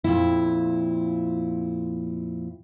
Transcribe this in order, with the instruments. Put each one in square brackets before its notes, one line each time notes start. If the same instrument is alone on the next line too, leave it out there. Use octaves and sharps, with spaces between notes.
[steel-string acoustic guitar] F2 A#2 E4